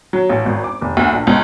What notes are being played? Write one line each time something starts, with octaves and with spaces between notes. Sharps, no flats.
F#3
A1
G#1
D6
F1
D2
A#1
C#2